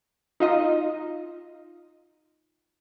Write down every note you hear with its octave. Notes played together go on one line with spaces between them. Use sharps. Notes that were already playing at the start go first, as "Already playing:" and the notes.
D#4 F4 D#5